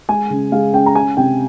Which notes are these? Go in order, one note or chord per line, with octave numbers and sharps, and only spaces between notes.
G#3 G#5
C#3
G#3 F5
C#4 G5
A#5
C#4 G#5
C3 G5